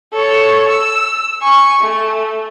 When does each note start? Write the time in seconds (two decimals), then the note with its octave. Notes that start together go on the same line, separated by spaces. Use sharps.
0.13 A4 C#5
0.69 E6
1.42 G#5 C#6
1.81 A3